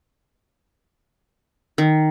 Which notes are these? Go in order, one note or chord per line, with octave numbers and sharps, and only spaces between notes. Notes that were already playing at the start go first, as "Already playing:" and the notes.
D#3